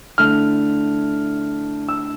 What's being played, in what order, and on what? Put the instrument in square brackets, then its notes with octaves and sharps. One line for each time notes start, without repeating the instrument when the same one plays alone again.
[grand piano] D3 A3 E4 F6
E6